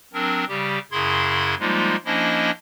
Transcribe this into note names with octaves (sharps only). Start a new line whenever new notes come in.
F#3 C4 D4 A#4
C#3 G3 G4
F#2 C#3 E4 G#4 C6 G#6
F3 G3 G#3 A#3 D#4 F4
F3 A#3 C#4 D4 E4 D#5